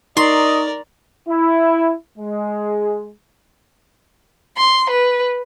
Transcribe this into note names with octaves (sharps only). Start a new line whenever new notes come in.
D#4 A#4 D5 D#5 C6 C#6
E4
G#3
C6
B4